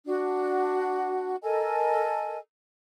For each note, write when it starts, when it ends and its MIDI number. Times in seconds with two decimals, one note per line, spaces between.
0.06 1.35 62
0.06 1.35 66
1.42 2.37 69
1.42 2.37 70
1.42 2.37 75
1.42 2.37 80